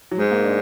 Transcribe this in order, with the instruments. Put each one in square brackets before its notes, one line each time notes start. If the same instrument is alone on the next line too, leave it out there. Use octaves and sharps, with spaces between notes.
[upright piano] F#3
[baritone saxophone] G#2 [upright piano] G#3
[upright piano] A#3
D4